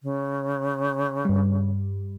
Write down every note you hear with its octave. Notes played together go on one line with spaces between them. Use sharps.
C#3
G2 G3